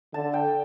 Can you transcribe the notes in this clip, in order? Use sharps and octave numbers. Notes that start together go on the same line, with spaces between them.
D3 A5
G5